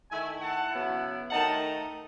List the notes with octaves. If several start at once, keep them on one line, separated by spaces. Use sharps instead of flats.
D#3 A3 E4 E5 G#5
F#5 A5
C#3 F#3 B3 E4
D#3 A3 D#4 F#5 A5